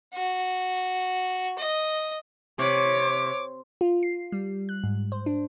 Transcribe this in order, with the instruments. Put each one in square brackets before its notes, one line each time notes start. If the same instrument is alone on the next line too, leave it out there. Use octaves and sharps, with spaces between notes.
[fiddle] F#4
D#5
[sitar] C3 [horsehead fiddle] C#5 [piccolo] D6
[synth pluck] F4
C7
G3
F#6
G#2
C5
D4